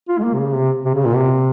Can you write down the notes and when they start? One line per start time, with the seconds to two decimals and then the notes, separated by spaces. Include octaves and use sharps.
0.09 F4
0.19 G#3
0.24 A#3
0.34 C3
0.39 C#3
0.55 C3
0.85 C3
0.95 C#3
1.05 A#2
1.16 C3